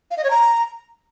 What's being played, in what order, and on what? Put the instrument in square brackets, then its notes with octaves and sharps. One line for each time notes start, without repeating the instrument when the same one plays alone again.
[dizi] F5
D#5
C#5
A#5